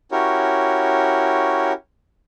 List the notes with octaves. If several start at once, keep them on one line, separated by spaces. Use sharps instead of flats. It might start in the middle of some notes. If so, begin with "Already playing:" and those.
C#4 E4 F#4 G4 A#4 C#5